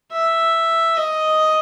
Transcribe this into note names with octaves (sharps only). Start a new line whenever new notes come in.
E5
D#5